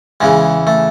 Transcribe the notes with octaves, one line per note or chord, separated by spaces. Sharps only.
E2 C#3 E3 G#3
A3